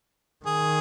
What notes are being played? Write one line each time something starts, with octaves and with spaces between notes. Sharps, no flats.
D#3 G#4